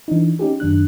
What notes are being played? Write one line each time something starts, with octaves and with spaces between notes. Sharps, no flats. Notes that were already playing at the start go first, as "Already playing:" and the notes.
E3 D4 D#4
C#4 D#4 G4 G#4
F#2 D#3 D4 F#6